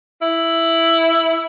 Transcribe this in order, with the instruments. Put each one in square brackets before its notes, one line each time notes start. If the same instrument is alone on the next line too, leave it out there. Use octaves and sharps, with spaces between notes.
[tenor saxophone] E4